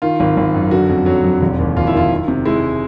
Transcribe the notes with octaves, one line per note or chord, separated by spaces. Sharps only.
D#3 F4
G#1
G#1
F#2
D3 F#4
F2
F#3
F2
E1
D#2
D#2 F4
E4
D#3 F4
D#3
C3
G#3 E4